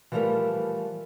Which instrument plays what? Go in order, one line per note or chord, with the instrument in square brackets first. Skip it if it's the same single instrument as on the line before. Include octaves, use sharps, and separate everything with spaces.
[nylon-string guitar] E3 F3 G3 A3 A#4 B4